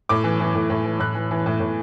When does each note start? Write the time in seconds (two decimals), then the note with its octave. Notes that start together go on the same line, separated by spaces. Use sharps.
0.09 A2 D6
0.24 E3
0.40 E3
0.55 A2
0.70 A2
0.85 E3
1.00 A2 F#6
1.15 E3
1.31 E3
1.46 A2
1.60 A2